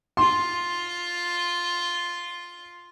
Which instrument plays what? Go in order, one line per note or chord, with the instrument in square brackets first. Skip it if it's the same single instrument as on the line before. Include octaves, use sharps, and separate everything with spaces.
[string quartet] F4 [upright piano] C6